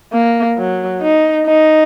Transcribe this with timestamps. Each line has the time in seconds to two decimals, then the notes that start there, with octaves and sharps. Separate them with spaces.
0.13 A#3
0.58 F#3
1.01 D#4
1.46 D#4